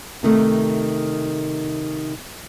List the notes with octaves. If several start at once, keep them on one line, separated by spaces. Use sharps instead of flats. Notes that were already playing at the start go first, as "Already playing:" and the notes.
C3 D#3 A3